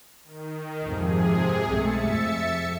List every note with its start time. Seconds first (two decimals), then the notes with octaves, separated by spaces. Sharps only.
0.24 D#3
0.85 F2 G#2 C3 F3 G#4
1.69 B1 G#3 A3 E5 A6 C#7
2.04 F2